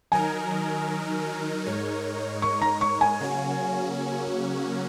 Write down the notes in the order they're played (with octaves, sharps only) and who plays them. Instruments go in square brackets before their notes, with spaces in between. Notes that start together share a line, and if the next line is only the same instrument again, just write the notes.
[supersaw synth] D#3 F#3 D#4 A#4 [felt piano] G#5
[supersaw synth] G#2 G#3 D#4 A#4 C#5
[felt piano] C#6
A#5
C#6
G#5
[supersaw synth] C#3 F#3 A#3 C#4 F#4